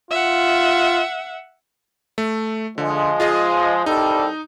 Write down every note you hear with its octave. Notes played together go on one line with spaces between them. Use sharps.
F4 E5 F#5
A3
D3 F3 G#3
F4 G#4 D#5
C2 G3 D#4 A4